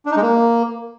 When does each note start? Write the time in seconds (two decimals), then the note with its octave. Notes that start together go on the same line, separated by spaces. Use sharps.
0.06 D4
0.11 D#4
0.17 G#3
0.22 A#3